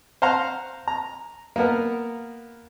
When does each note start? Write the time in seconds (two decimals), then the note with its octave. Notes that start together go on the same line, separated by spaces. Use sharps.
0.22 C5 F5 F#5 A#5 C6
0.88 A#5
1.56 A#3 B3 A#4